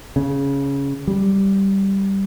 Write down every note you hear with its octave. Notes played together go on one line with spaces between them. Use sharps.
C#3
G3